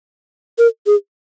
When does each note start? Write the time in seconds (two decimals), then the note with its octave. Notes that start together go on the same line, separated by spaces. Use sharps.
0.58 A#4
0.86 G#4